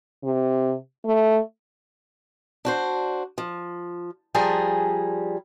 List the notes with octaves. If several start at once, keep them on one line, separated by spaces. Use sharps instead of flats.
C3
A3
D4 F#4 C5
F3
F3 G3 G#4 G#5 A#5